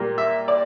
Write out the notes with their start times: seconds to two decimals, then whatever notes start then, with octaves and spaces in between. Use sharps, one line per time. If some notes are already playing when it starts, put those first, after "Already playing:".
Already playing: A#2 G3 A#3
0.18 E5
0.48 D5